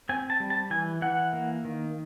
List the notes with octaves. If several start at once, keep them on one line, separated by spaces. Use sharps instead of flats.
C4 G#5
A5
G3
A5
E3 G#5
E3 F#5
A#3
D#3